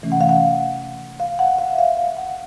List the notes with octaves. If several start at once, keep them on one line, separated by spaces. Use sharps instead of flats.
C3 E3 A3 C#4
F#5
F5
F#5
F5
F#5
F5
E5
F5
F5
F#5